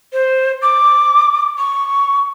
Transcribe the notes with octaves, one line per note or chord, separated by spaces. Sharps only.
C5
D6
C#6